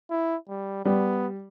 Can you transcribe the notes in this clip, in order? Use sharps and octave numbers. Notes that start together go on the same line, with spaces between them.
E4
G3
G3 B3